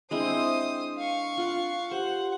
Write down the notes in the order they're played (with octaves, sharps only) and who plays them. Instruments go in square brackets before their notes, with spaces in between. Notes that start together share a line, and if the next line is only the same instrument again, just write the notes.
[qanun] G#3 C4 E4 [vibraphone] D4 [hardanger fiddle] C5 D#6
[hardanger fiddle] F5 C#6
[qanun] F4 F#5
[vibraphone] G4 [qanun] C5 [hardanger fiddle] F#5